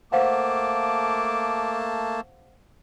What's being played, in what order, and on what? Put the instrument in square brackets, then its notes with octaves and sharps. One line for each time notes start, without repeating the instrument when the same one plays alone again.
[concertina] A3 A#3 A5 [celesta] C5 F5 F#5 [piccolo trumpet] D6